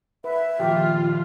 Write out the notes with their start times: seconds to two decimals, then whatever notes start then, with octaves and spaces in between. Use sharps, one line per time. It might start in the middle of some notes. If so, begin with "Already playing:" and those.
0.24 B4 E5
0.60 A#2 D#3 F3 F4 G4